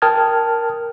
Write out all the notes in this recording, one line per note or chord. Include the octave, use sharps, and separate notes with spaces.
A#4 G5 A5 D#6 F6 G#6